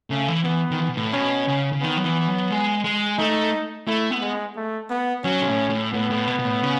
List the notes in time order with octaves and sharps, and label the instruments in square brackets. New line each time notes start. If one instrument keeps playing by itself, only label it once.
[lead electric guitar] C#3 [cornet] A3
[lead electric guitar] E3
[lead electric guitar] E3 [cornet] B3
[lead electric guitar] D#3
E3
B2
A2
[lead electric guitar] B2 [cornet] C#4
[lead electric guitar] C#3
C#3
[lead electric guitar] D#3 [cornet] B3
[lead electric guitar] F#3
E3
F#3
G#3
G#3
[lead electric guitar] A3 [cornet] D#4
[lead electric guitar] A3 [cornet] E4
[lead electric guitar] B3
[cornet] G#3
A3
B3
[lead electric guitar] F#3 [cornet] C#4
[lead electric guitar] B2
A2
A2
[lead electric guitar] A2 [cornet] B3
[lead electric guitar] A2
B2
B2
A2
C#3